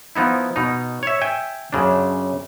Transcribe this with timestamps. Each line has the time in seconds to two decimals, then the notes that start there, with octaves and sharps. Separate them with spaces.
0.15 F3 B3 D#4 E4
0.56 B2 D#4
1.03 C#5 E5
1.22 E5 G5 G#5
1.73 F#2 C#3 D4